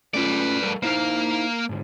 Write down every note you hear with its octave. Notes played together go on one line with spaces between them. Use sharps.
A3 C#4 F4 B4 D5
G3 A4 A#4
A#3 D#4 E4 C5 F5
G#2 D3